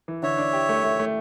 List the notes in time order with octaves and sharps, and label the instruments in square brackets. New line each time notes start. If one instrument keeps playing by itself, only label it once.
[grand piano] E3
[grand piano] D3 [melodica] C#5 E5
[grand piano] D4
G4
A3
A3
A3